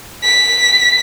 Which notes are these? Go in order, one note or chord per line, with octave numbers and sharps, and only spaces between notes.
B6